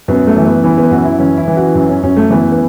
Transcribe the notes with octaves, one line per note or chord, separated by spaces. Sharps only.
F#2 B3
A3
E3
B3
E3 B3
B3
F#2 F#4
E4
E3 C#4
E4
E3
F#4
F#2
C#4
F#2 C#4
A3
E3 B3
B3